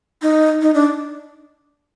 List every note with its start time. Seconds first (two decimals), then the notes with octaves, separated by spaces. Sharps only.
0.22 D#4
0.62 D#4
0.74 D4